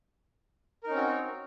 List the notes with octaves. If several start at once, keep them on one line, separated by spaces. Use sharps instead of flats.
C4 C#4 D#4 F#4 A#4